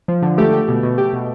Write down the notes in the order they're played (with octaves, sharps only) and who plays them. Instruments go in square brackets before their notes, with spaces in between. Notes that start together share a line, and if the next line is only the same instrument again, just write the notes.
[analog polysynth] F3
D3
[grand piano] A3 [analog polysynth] G4
[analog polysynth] G4
B2
B2
G4
B2